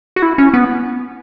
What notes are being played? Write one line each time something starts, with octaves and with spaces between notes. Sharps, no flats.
F#4
E4
C#4
B3